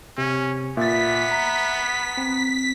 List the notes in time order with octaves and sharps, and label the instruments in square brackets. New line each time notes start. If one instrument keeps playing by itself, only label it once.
[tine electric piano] C3 [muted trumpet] C#4
[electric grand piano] A#2 A6 [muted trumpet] B3 [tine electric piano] E5 [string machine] B6
[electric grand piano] A#5
[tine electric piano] C4